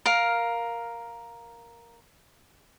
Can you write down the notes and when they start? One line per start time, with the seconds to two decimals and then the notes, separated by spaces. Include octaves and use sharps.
0.06 A#4 F5